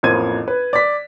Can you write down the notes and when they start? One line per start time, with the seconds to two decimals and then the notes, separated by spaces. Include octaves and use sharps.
0.03 A1 F2 A#3 C5 G#6 D#7
0.48 B4
0.73 D5 B6